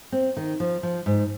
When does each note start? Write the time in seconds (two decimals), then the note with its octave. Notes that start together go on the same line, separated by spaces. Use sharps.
0.12 C4
0.37 D#3
0.60 F3
0.83 F3
1.06 G#2